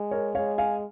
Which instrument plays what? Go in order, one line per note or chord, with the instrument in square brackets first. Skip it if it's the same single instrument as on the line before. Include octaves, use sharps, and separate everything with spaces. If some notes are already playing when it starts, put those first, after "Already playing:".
Already playing: [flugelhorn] G#3
[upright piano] A#4 C#5
[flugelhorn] G#3 [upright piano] C#5 F5
[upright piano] F5 G#5